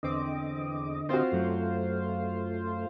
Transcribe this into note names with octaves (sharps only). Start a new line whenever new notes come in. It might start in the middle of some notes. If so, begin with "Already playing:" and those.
E2 D3 C4 D#5 D6
C4 F4 F#4 C5 F5
F#2 F#3 A3